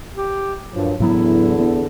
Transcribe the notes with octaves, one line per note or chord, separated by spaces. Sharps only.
G4
G2 A#2 F3 F#3
E2 A2 D3 F#3 B3 E4
B3